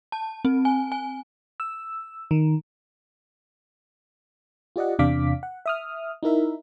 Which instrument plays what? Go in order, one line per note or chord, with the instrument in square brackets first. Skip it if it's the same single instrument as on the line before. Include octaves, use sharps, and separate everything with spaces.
[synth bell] A5
C4
G#5
G#5
[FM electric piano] E6
D#3
F4 G4 D5 D#5 F#5
E2 C3 D4 F5 D6 B6
F#5
E5 D#6 F6
D#4 E4 A#4 E5